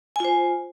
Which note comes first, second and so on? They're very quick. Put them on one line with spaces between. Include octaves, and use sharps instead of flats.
G#5 F4 C5